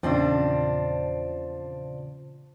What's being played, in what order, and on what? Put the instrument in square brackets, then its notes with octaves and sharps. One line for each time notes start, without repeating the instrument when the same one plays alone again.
[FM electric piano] E2 A#2 C#3 [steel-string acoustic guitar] F3 C4 D4